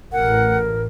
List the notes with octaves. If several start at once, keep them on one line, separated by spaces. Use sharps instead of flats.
A1 A2 A#4 F#5